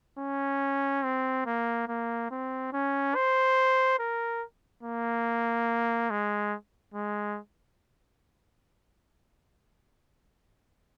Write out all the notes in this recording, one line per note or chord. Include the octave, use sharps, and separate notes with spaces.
C#4
C4
A#3
A#3
C4
C#4
C5
A#4
A#3
G#3
G#3